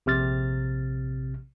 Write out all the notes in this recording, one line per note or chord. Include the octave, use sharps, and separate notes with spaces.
A#1 C3 F6 A6